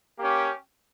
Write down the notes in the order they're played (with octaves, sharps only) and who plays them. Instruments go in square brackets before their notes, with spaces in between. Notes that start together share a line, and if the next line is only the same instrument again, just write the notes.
[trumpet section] A#3 C#4 G4